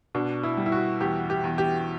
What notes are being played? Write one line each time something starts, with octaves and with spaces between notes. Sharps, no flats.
B2 D4
E4
G3
E4
F#4
E2 G4
G4
E2
G4